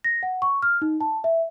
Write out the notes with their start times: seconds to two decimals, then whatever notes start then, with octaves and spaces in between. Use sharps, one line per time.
0.04 A#6
0.23 F#5
0.42 C#6
0.62 F6
0.82 D#4
1.01 A5
1.24 E5